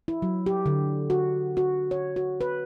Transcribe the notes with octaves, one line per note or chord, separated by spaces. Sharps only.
E4
F#3
G4
D3
F#4
F#4
C#5
F#4
B4